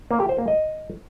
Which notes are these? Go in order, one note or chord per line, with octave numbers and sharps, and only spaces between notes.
A#3
G4
C5
A#3
D#5